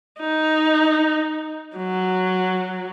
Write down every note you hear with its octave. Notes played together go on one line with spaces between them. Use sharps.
D#4
F#3